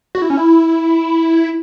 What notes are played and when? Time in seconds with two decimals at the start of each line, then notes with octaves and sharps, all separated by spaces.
0.15 F#4
0.22 E4
0.30 C#4
0.37 E4